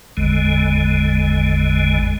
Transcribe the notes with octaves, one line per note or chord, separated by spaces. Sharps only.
G#1 E2 D3 G#3